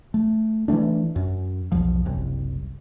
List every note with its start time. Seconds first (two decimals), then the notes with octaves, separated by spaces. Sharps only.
0.14 A3
0.68 E3 F#3 A3 D4
1.16 F#2
1.72 B1 E2 F3
2.06 F#1 C2